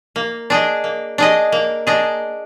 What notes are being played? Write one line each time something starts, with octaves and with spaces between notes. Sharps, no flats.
A#3
D4 G#4 D#5
A#3
D4 G#4 D#5
A#3
D4 G#4 D#5